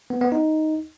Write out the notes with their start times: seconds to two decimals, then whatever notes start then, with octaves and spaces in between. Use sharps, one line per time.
0.10 B3
0.21 B3
0.32 D#4